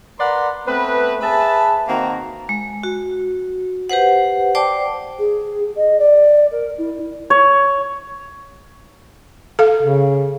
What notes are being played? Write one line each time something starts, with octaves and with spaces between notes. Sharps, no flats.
A#4 B4 D5 F#5 A#5 C6
A3 B3 C4 B4
G#4 B4 E5 A5
D#3 A#3 C4 F#4 A#5
G#3
F#4
G4 B4 C5 F#5
C5 D5 G5 A5 D6
G#4
D#5
D5
A#4
E4
C#5
A4 F5
C#3